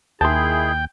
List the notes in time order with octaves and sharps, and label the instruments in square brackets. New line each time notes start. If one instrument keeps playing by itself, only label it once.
[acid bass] D#2 [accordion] D#3 E4 G#4 [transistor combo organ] G5 [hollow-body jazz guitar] A5 C6